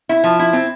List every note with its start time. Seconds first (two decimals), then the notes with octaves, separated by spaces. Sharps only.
0.09 E4
0.24 F3
0.39 E4
0.53 C4